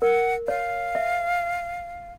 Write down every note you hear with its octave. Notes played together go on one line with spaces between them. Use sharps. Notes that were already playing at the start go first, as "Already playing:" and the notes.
A#4 F#5
C#5 F5
E5